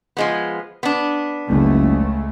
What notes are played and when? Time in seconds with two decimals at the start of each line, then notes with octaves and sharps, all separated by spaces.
0.17 F3 G#3 B3
0.83 B3 D4
1.50 F#1 C#2 C#3 A3